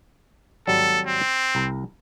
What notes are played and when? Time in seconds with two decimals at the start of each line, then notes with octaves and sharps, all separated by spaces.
0.67 G#1 F#3 G3 A4
1.07 C4
1.55 C2 A#5